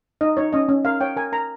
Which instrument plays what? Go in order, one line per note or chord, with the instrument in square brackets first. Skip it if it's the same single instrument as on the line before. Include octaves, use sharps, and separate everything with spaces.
[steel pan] D#4 D#5
D#4 C#5
C#4 D#5
C#4
A#4 F5
C#5 G5
A#4 G#5
A#4 A#5